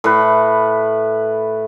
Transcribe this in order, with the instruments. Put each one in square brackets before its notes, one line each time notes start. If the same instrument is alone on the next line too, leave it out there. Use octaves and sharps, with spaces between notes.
[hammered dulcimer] A2 B4